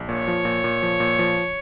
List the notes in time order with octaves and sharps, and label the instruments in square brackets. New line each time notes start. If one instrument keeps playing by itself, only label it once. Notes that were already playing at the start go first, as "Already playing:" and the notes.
Already playing: [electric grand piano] A#1
[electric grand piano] A#2 [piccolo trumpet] C#5
[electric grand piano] F3
A#2
A#2
F3
A#2
F3